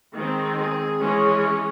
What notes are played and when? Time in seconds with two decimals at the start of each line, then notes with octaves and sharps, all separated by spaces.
0.14 D#3 G#3 C4
0.58 G#4
1.01 E3 G#3 C#4